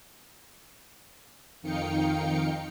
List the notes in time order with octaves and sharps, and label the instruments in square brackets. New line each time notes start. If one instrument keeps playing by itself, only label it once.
[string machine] F2 D#3 D#4 F5 G5 C#7